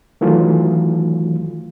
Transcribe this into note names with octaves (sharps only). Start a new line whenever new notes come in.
D#3 E3 F#3 A3 F4